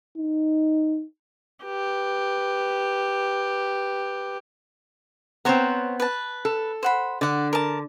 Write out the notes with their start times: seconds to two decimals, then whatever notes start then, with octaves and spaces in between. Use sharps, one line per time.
0.18 D#4
1.65 G4 B4
5.45 B3 C4 C5 C#5 A#5
6.00 B4 A5
6.45 A4
6.83 C5 F#5 B5
7.21 D3 D5 F#5
7.53 A#4 A5